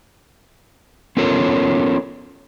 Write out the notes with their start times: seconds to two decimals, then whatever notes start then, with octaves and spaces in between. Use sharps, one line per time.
1.17 B3 C#4 F4 A4 A#4 C#5